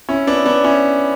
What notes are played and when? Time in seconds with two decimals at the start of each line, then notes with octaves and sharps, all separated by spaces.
0.09 C#4 E4
0.27 B3 D4
0.37 E4
0.46 B3 D4
0.64 C#4 E4